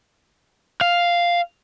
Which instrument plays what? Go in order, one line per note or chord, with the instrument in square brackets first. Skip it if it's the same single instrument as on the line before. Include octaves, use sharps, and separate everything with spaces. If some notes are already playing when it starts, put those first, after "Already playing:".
[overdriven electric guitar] F5